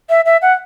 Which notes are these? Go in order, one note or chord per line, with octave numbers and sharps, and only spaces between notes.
E5
E5
F#5